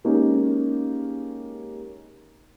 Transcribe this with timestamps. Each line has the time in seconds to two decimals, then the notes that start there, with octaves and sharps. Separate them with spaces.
0.04 G#3 A#3 C#4 D#4 G4 A#4